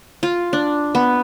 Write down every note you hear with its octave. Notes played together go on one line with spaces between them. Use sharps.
F4
D4
B3